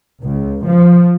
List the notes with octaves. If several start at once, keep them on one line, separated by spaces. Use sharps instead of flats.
C#2
F3